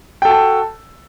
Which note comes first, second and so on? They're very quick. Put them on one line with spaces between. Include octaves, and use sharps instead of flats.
G5 A4 F#4 A5